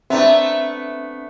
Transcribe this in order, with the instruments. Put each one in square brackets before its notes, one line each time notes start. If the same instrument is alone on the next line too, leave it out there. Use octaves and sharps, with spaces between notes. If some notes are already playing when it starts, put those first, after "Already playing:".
[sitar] A3 B3 [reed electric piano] C4 D4 [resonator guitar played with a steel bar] E5 A#5